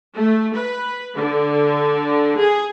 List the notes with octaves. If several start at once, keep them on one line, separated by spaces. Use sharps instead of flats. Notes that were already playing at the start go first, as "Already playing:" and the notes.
A3
B4
D3
G#4